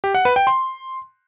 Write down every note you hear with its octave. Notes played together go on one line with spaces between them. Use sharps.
G4
F#5
B4
G5
C6